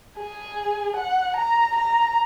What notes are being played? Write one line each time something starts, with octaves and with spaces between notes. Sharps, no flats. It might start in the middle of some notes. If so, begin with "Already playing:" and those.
G#4
F#5
A#5
A#5